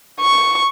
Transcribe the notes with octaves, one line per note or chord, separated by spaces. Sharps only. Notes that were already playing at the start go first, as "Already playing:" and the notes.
C#6